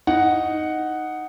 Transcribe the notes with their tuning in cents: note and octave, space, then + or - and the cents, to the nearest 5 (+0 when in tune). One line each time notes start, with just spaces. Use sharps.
D#4 +0 F#5 +0